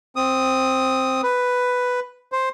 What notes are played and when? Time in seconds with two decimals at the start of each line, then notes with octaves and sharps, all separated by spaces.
0.16 C4 D#6
1.23 B4
2.32 C5